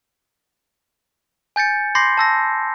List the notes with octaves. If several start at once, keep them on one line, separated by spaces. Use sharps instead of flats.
G#5 G6 A6 C#7
B5 C6 D6 G6 A#6 C7
A5 E6 A#6